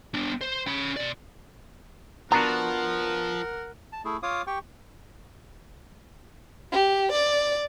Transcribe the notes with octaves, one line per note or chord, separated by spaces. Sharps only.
B3 D4
C5
C#4 B5
B2 D5
F3 B3 D4 F#4 A#4 F#5 A#5
A5
A3 E4 G#4
F4 C#5 F5 D6 D#6
G4 G5 C#6
G4
D5